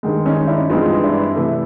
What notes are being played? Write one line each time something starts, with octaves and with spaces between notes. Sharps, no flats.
G2 D#3 G#3
C#4 D#4
D#4
D4 E4
G2 E3 G#3 C4 D#4 F4
D4 E4
C3 E3 A3